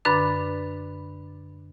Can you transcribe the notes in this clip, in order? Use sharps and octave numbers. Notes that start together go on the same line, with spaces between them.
F#2 D3 D4 B4 B5 D6